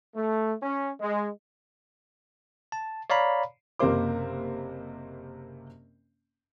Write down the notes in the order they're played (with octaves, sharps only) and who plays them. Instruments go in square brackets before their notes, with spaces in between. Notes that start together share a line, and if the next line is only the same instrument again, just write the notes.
[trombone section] A3
C#4
G#3
[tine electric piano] A5
C#5 D5 F5 A#5 B5
[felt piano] F#1 C3 A#3 C5 D6